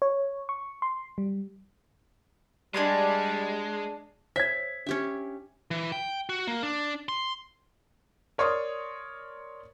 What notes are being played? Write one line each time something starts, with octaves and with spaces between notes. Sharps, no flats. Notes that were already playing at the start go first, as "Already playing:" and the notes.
C#5
C#6
C6
G3
G3 G#3 D4 G#5 C6
C5 C#5 E5 G#6 B6
C#4 D4 G4 E5
E3
G5
F#4
A#3
D4
C6
A#4 C#5 D5 C6 C#6 D#6